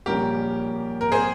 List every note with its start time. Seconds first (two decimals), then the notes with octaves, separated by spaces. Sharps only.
0.06 A#1 A#2 G3 C#4 G4 A#4
1.01 A#4
1.12 G#4 C5